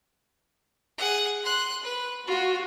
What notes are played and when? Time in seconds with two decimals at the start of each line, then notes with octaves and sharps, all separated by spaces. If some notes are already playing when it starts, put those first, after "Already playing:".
0.98 G#4 F#5
1.43 C6 F#6
1.83 B4
2.27 F4 F#4